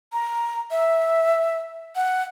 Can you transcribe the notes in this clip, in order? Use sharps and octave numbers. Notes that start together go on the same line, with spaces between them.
A#5
E5
F#5